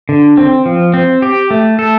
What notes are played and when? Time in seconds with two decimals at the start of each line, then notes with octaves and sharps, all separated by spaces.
0.09 D3
0.38 C4
0.66 F3
0.94 C4
1.22 G4
1.51 A3
1.79 A4